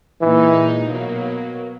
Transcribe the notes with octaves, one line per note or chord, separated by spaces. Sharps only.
A#2 E3 G#3 D#4
B2 F#3 A#3